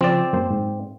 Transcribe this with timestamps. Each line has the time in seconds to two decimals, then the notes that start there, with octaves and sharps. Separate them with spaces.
0.01 C#3 F3 C4 D5
0.33 F#2 A#3 C5
0.50 G#2